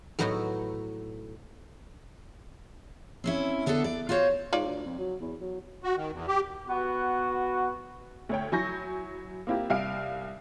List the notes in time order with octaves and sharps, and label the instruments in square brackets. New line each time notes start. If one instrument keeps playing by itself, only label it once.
[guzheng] A2 F#3 B3 D#4 E4 F#4
[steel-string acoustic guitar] C4 C#4 E4
D3 B3 D4 E4 A4
D5
F4 F#4 C5 C#5
[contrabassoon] G#2 [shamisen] F4 C#5 D5
[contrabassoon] D2
F2
F#3
E2
F#3
[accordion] F#4
D#3
E2
G4
[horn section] B3 F#4
[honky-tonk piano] D2 C#5 G5
F#3 E4 G#5 C#6 G6 A#6
A#3 C4 E4 F4 G4
C2 F5 F6 D7